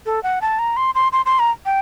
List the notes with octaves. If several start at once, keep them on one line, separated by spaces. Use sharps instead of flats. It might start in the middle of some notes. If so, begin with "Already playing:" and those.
A4
F#5
A5
A#5
C6
C6
C6
C6
A#5
G5